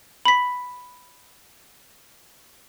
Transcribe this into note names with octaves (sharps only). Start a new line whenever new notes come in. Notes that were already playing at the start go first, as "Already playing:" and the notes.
B5 B6